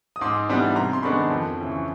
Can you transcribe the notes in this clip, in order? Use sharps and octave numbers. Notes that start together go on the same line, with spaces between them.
D#6
G#2 C6 D6
E3 G3 B3 D4
C3 A#5 C6
C6
D#3 G#3 B3 D4 B5 C#6
F2
C#3 E3
C#6